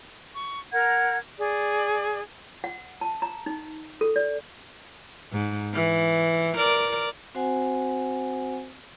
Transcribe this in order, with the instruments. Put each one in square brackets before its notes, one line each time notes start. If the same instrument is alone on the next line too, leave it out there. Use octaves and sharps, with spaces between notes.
[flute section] C#6
A#4 F#5 A#5 G#6
G#4 D5
[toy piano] F#5
A5
A#5
D#4
A4
D5
[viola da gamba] G#2
E3
A#4 D5
[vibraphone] C4 F#4 C5 F#5 G#5